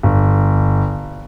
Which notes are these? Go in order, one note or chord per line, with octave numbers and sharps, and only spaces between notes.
G1